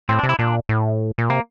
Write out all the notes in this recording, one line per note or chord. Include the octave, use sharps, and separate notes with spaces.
A2 C4
C3 D4
E4
A#2 D4
A2
A#2
C3 A#3